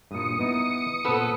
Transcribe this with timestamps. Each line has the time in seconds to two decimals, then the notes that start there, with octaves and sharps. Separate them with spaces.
0.11 G2 A#2 D#6 C#7
0.39 B3 D#4 E4
1.05 A#2 B3 A4 C5